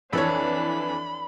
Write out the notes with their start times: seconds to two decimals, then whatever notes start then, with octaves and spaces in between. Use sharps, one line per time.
0.13 F2 E3 D4 A4 C#5 B5